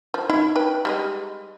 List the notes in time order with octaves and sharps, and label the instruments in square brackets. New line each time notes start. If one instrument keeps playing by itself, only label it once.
[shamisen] F3
[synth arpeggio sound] D#4 [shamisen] E4
[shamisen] B4 G5
G3 G#3 D#5